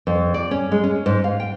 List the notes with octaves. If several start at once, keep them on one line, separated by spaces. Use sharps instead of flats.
F2
D5
C#4
G#3
C#4
G#2
F5
G5